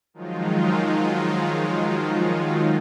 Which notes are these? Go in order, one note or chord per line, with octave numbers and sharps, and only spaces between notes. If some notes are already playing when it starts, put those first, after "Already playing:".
D#3 F3 F#3 G#3 D#4 F4